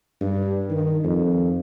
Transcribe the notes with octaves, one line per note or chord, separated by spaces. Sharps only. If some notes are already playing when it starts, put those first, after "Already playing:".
G2
D#3
F2